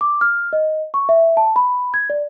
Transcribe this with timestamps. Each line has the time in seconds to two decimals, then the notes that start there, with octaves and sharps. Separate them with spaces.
0.01 D6
0.21 F6
0.53 D#5
0.94 C#6
1.09 E5
1.37 A5
1.56 B5
1.94 G#6
2.10 D5